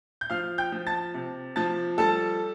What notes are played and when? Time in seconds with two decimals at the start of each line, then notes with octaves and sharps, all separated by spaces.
0.21 G6
0.30 F3 F5 F6
0.58 G5 G6
0.72 F3
0.87 A5 A6
1.14 C3
1.56 F3 A5 A6
1.98 G3 A4 A5